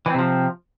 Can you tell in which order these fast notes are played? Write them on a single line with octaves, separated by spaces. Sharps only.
E3 C4 C3 F3